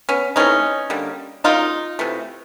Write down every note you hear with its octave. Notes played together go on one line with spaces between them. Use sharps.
B3 C#4
C3 E3 A3 C#4 D#4
D3 G3 A#3
C#3 F#3 A#3 D#4 F4
C3 E3 A3